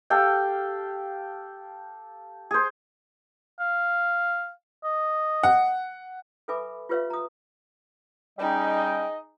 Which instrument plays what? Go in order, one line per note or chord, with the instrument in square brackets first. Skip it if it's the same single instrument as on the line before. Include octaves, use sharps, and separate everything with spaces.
[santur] G4 A4 F5 G5
G#4 C5
[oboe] F5
D#5
[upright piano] F#5
[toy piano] A4 B4 E5 G#5 B5 D6
F4 G4 B4 C#5 E5 F5
A#5 D#6
[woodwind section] G3 C#4 G5 [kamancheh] D#4 G#4 [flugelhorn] D#5